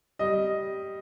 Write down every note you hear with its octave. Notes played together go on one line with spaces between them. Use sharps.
G3 D#5